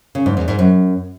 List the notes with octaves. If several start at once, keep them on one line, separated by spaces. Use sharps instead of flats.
C#3
G#2
E2
G#2
F#2